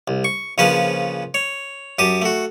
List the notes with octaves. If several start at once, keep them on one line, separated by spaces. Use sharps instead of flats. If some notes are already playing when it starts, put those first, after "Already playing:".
C2
C#6
A#1 C#3 F3 C#4 B4 A5
C#5
F#2 G4 A5 D#6
A3 F#4